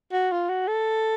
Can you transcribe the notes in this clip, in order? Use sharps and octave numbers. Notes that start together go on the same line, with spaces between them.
F#4
F4
F#4
A4